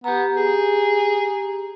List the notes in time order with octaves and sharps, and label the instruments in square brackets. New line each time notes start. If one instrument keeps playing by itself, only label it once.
[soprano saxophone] B3 [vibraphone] G4 A#5
[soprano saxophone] G#4